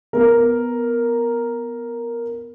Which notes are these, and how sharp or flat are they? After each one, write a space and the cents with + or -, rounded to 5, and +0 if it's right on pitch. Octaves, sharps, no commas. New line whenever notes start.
B3 +0 A#4 +0